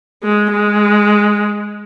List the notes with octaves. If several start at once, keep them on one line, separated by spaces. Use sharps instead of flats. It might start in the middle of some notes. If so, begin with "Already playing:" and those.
G#3
G#3